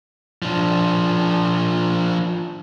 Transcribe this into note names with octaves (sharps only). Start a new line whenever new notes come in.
F3 D4